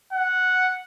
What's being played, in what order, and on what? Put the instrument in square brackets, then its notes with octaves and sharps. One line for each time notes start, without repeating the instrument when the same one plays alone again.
[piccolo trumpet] F#5